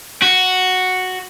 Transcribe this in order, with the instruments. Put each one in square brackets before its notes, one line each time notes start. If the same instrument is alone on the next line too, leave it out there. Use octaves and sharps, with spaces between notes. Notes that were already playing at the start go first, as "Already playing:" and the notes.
[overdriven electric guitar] F#4